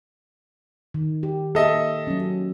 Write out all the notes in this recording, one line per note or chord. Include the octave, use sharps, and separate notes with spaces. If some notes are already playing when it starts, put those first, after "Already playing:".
D#3
G4
A#3 A4 D#5 E5
F#3 C#4